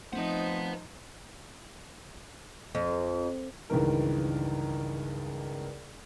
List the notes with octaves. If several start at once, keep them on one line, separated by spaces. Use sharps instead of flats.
F3 A3 C4 D#4 B4 C5 F#5
F2
C#2 G2 D#3 E3 A#4